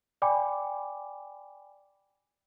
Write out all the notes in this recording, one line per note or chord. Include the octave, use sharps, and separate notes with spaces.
D5 G5 G#5 B5 D6